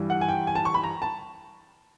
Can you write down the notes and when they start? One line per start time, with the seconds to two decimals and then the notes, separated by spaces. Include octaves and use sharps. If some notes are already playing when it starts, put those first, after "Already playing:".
Already playing: G2 E3 G3
0.10 F#5
0.21 G#5
0.29 G5
0.47 G#5
0.55 A5
0.65 C#6
0.74 B5
0.84 A#5
1.02 A5